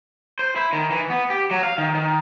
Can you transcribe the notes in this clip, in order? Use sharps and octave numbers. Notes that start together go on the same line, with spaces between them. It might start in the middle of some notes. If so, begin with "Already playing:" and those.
C5
E4
D#3
E3
B3
G4
F#3
F5
D#3
D#3